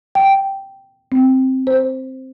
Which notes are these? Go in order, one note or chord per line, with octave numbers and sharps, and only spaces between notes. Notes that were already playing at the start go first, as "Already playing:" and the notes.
G5
C4
C5